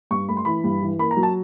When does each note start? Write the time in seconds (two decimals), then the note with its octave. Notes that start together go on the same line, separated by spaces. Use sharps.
0.11 G2 C#6
0.29 A3 B5
0.37 C6
0.45 E3 B5
0.64 G2
0.82 E3
0.99 A#3 B5
1.11 A#5
1.17 F#3
1.23 A5